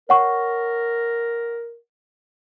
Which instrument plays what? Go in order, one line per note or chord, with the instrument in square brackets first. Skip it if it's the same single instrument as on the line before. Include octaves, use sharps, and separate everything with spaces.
[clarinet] A#4 [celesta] C#5 F#5 C#6